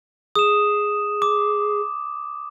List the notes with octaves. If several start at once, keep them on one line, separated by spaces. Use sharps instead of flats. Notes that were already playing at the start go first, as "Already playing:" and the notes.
G#4 D#6 E7
D6